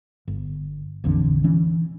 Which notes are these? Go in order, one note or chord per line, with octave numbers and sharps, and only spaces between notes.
G1
A#1 F2 D3 E3
E3 C#4